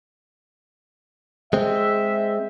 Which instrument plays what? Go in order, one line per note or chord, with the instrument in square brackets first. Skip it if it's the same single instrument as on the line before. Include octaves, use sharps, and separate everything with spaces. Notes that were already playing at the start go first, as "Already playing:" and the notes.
[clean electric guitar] G#3 C4 [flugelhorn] E5